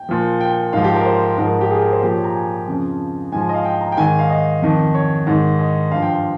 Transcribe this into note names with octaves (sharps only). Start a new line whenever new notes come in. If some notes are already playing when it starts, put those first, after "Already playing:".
Already playing: G5
A#2 F3
G5
G#2 F3 F5
G4
A#4
C5
G#2 F3 A#4
G4
G#4
A#4
C5
A#2 F3 G4
C#5
A#5
G#5
F2 C#3 F3
G#2 F3 G#5
D#5
F5
G5
A#5
G5
G#2 D#3 G#5
F5
D#5
F2 D#3
C#5
G#2 D#3
D#5
G2 F3 F5
G5
F5